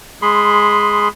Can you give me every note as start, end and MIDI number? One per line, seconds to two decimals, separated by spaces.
0.22 1.08 56
0.22 1.08 68
0.22 1.08 83
0.22 1.08 84